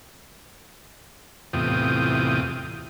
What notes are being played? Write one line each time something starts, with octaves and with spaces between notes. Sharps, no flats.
E2 A2 C3 F4 G5 D#6